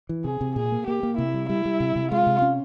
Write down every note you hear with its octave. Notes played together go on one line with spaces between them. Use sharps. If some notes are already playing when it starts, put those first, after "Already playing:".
E3
C3 G#4
C3
A#2 G#4
A#3
A#3 G4
A#3
C3 E4
G3
G3 E4
G3
C3
C3
G#3 F4
C3
C#4